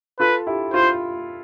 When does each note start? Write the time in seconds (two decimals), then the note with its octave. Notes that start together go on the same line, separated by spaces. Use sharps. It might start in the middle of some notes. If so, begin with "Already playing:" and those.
0.19 F4 A4 B4
0.47 E4 G4
0.73 F4 C5